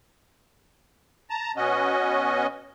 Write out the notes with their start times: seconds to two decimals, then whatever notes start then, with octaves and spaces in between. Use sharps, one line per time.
1.30 A5 A#5
1.57 B2 C#4 F#4 D#5